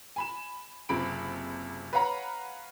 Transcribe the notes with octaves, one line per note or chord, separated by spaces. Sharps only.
G#5 B5 E7
F#1 C#2 C3 B5 D7
B4 C#5 F5 F#5 A#5 B5